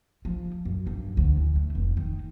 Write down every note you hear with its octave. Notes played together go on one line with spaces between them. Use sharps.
F3
F#2
G2
D2
E3
A3
F1
D#3